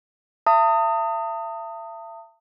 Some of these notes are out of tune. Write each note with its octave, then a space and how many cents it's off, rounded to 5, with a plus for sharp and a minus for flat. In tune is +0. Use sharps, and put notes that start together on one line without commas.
E5 +35 A5 +45 D#6 +0